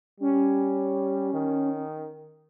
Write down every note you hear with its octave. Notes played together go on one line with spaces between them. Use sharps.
G3 C#4
D#3